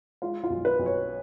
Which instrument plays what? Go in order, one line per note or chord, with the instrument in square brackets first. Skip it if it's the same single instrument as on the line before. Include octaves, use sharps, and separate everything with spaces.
[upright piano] G#3 F4
F4
B1
B4
B1
C#5